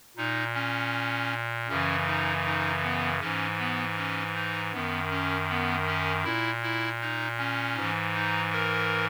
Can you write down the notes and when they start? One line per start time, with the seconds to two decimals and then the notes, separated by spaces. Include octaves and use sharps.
0.17 A#2 D#4
0.54 C#4
1.68 F#2 C#3 E3 C#4
2.06 D#4
2.45 D#4
2.83 B3
3.20 G#2 E3 C#4
3.58 B3
3.97 C#4
4.35 D#4
4.73 F#2 D#3 B3
5.11 C#4
5.49 B3
5.86 C#4
6.24 A#2 E4
6.63 E4
7.01 D#4
7.38 C#4
7.76 G#2 E3
8.14 D#4
8.52 A#4